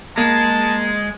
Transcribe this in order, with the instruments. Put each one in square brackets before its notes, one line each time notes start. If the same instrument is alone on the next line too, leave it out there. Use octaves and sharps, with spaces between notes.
[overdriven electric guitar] G#3 [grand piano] A#3 [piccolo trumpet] A5